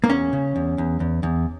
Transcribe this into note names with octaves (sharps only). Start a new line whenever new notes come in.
A#3
E2 C#4
C#3
E2
E2
E2
E2